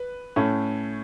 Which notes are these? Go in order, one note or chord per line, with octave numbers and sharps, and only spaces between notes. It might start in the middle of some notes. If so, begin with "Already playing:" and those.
Already playing: B4
A2 A3 C#4